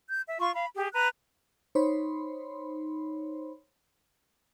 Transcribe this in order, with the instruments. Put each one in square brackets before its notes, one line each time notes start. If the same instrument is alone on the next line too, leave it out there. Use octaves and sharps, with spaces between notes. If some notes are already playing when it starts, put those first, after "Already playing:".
[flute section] G6
E5
F4 C6 C#6
F5 B5
G4 G#4
B4 A#5 F#6
[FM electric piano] D#4 C5 C#5 B5 C6